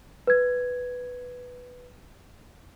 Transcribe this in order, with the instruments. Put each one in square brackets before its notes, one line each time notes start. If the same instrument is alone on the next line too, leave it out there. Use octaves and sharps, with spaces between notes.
[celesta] B4 G#6